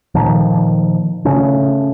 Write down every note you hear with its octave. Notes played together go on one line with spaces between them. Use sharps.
A#2 D#3 F3
C#3 A3 C#4